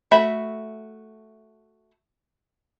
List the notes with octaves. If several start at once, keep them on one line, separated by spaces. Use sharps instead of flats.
A3 F#4 E5 B5